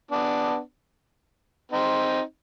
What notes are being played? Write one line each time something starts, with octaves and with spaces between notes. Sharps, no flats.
B3 D4
C4 D#4